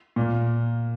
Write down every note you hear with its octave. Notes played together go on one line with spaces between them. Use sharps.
A#2 A#3